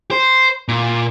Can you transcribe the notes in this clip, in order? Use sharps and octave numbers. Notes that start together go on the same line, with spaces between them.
C5
A#2